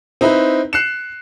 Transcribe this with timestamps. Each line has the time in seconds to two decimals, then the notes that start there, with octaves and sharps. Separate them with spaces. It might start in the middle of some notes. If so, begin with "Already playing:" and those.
0.21 C4 D#4 E4 B4
0.73 F#6 C7 C#7 E7